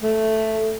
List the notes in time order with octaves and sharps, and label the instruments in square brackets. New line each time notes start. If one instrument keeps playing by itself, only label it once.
[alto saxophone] A3